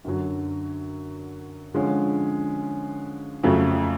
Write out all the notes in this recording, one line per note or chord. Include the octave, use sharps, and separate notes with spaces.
F#2 D3 F#3
D3 F3 G#3 C#4
F2 C#3 F#3 A3